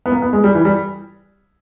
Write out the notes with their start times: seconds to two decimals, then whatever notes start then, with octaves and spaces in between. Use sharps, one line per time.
0.06 B3
0.12 A#3
0.22 B3
0.33 G#3
0.44 G3
0.55 E3
0.65 G3